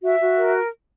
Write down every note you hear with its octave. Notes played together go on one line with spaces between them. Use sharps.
F#4 E5
F#4
A#4